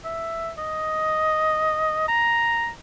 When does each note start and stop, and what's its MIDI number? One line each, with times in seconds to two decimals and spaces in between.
0.05 0.51 76
0.58 2.08 75
2.08 2.69 82